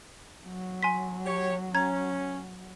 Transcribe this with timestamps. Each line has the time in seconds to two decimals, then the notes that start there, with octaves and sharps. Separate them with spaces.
0.45 F#3
0.83 G#5 C6 B6
1.26 G4 C#5
1.75 C#4 A#5 G#6